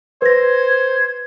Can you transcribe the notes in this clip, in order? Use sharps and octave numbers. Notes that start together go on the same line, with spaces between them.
B4 C5 G#6 A#6